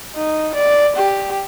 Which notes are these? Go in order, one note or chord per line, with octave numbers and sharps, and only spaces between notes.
D#4
D5
G4